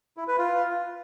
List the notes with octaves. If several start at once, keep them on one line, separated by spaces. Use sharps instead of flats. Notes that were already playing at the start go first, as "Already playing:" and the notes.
E4
B4
F4